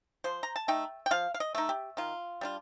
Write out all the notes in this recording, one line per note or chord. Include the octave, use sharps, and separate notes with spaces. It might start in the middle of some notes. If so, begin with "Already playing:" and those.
F3 C5
A#5
A5
A3 D#4 G5
G5
F3 F5
F5
D#5
A3 D#4
G4
D#3 F4
G3 D4 F4